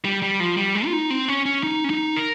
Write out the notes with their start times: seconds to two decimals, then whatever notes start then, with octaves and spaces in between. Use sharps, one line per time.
0.05 G3
0.22 G3
0.40 F3
0.57 G3
0.75 G#3
0.86 F4
0.93 D#4
1.10 C4
1.28 C#4
1.45 C#4
1.63 D#4
1.84 C#4
1.90 D#4
2.16 A#4